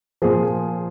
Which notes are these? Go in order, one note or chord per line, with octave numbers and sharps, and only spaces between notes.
A#2 F3 G#4